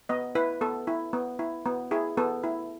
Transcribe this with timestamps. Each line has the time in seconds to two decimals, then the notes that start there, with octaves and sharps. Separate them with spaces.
0.09 B3 D#5
0.35 E4 B4
0.61 B3 A4
0.87 E4
1.13 B3
1.39 E4
1.66 B3
1.91 E4 G#4
2.17 B3 A4
2.44 E4